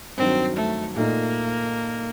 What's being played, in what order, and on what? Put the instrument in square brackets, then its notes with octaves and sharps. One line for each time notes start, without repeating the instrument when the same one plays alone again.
[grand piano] G2 D#3 F#3 [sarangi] C4
[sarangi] A3
[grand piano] A#2 A3 D#4 [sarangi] A#3